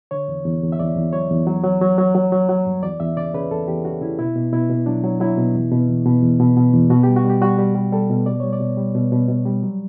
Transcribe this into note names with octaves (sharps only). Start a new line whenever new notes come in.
D3 C#5
E2
E2
E2
E5
E2 D5
E2
F#3 C#5
E2
F#3
F#3
F#3
F#3
F#3
F#3
F#3
G2
E2 D5
E2 E5
C#3 D5
C#3 B4
E2 A4
E2 G4
C#3 F#4
C#3 E4
B2 E4
B2
B2 E4
B2
F#3 D4
F#3
F#3 E4
B2
E2
B2
E2
B2
E2
B2
B2
E2
B2 F#4
G3 G4
F#4
G3 G4
G3 F#4
G3 G4
G3
G3 A4
B2
B2 D5
G3 C#5
D5
B2
G3
B2
B2
B2
G3
F#3